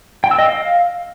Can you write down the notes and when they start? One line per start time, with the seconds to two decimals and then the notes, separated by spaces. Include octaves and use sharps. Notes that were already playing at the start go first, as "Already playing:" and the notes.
0.24 G5
0.31 E6
0.38 D#5
0.46 F5